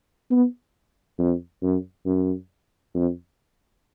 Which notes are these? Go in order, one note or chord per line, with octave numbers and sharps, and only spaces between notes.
B3
F2
F#2
F#2
F2